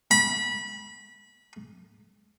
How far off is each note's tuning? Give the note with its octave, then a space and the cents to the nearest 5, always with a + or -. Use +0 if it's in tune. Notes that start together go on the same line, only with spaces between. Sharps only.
B5 -25